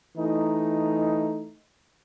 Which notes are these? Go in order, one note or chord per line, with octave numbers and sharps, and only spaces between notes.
E3 A3 D#4